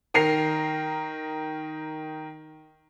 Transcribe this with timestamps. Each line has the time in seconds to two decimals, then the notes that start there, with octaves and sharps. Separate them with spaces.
0.14 D#3 A#4 C7 F7